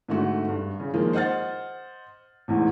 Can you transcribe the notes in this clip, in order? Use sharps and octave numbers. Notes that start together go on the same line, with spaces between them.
G#2 D3 A3 F#4
G2
C#3
D#3 F3 G#3 A#3
C5 D#5 F#5 F6 A6
A1 E2 G#2